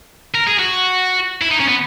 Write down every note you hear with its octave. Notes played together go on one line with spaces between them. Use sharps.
A#4
G#4
F#4
E4
D#4
C#4
B3